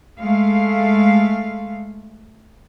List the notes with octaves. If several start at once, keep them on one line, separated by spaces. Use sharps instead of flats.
G#3 A3 F5